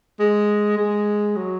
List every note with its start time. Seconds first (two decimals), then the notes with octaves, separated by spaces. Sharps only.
0.20 G#3
0.77 G#3
1.36 F#3